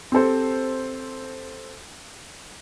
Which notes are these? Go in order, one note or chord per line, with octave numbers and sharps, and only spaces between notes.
C4 G4 A4 C5